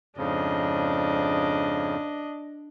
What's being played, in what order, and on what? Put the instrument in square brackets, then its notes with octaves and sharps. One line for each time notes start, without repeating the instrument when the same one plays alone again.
[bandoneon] F2 G#2 C#3 [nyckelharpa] D4 D#5